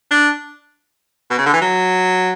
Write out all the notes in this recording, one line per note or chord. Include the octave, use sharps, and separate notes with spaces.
D4
B2
C#3
D3
E3
F#3